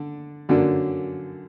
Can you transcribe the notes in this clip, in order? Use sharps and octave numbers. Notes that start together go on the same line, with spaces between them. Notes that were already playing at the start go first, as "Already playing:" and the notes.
Already playing: D3 D4
F#2 D3 F#3 A#3 D4